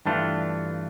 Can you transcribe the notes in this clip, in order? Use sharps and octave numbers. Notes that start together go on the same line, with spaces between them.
G2 E3 A3 D4 F4